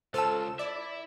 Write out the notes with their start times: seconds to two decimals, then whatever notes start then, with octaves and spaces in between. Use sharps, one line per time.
0.14 C#2 F4 A4 C5 A5 E6 E7
0.59 E4 D5 E5